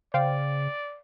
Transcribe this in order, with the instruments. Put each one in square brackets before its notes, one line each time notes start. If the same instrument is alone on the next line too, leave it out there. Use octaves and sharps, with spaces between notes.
[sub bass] C#3 [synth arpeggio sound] C5 F5 G5 [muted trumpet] D5